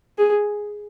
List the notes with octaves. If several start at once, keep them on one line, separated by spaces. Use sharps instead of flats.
G#4